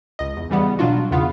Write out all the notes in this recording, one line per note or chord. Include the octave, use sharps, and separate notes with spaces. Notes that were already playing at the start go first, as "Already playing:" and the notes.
C#2 D#5
E2
C#3 E3 G3 B3
B2 F#3 D4 F4 F#4
E2 C#3 B3 F4 F5